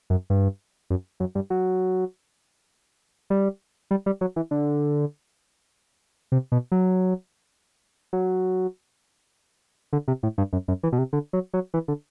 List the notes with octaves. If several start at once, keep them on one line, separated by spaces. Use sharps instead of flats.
F#2
G2
F#2
F#2
G2
F#3
G3
G3
G3
F#3
E3
D3
C3
B2
F#3
F#3
D3
C3
A2
G2
F#2
F#2
E3
B2
C3
D3
F#3
F#3
E3
D3